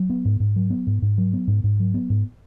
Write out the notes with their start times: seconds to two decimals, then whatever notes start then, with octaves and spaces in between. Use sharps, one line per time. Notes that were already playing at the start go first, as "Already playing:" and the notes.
Already playing: F#3
0.10 B3
0.25 G#2
0.40 G#2
0.56 F#3
0.70 B3
0.87 G#2
1.02 G#2
1.18 F#3
1.33 B3
1.48 G#2
1.64 G#2
1.80 F#3
1.94 B3
2.10 G#2